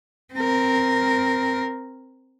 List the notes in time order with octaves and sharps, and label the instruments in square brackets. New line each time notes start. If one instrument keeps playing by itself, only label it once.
[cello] C4 A#4